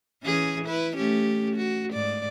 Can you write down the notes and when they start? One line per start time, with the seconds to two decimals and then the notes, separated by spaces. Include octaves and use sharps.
0.23 E3 C#4 G#4
0.65 E4 B4
0.96 A3 C#4 G4
1.56 F#4
1.92 G#2 D5